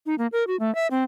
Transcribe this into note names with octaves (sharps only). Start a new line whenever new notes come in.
D#4
A#3
A#4
F#4
A3
E5
C4